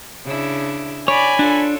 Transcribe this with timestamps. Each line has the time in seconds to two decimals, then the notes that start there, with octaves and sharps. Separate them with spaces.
0.25 C#3 D4 E4
1.08 C#5 D5 G#5 B5
1.39 D4 F4 A4 C#5